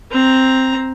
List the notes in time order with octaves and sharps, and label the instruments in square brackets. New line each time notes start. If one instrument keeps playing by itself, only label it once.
[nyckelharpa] C4 A#5